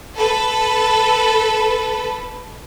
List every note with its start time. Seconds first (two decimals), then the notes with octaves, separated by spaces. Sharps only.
0.17 A4 B4